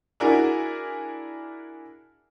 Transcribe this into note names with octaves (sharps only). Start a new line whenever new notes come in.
D4 E4 F#4 G#4 A#4